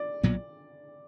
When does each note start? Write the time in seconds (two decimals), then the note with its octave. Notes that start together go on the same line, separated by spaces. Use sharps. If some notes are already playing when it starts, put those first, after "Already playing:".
Already playing: D5
0.23 B1 A#2 F#3 B3